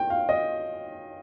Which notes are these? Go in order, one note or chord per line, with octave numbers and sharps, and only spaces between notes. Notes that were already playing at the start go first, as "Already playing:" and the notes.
Already playing: G5
F5
D#5